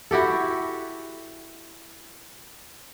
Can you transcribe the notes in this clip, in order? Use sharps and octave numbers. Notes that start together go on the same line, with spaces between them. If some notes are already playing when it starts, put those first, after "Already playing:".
E4 F#4 G4 A4